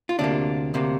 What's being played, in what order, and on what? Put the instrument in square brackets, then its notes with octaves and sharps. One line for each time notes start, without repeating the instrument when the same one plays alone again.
[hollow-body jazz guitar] F4
D2 C3 A#3 D4
D2 C3 A#3